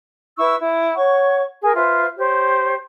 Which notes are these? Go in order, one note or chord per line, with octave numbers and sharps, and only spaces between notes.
E4 B4 C#6 E6
E4
C#5 F#5 C#6
G#4 A#4
F4 B4 C5 E5
G4 C5 C#5